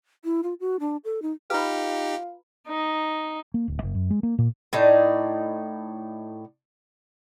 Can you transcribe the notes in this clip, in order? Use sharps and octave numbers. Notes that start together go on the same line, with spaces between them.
E4
F4
F#4
D4
A4
D#4
D#4 F4 G4 B4 A#5 B5
D#4
A#3
D1
F#1
F#2
G#3
A#3
A#2
A2 D#4 D5